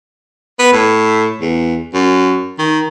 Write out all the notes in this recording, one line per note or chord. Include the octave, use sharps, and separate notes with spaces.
B3
A2
E2
F#2
D#3